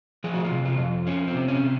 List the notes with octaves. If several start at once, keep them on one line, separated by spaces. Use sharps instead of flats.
F3 G#4
F#4
F4
C3
F4
F2
F3 C#4
C4
C3
C#4
C3